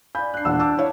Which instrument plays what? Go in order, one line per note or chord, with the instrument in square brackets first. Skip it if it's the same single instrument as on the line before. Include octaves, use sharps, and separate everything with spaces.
[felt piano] D5 G6 [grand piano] F5 G#5 B5
[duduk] D4 [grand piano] F#6 C7
[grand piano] E1 E6 [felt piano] A#2 F#5
[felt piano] A5 E6 [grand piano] D6
[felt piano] E4 C#5 F5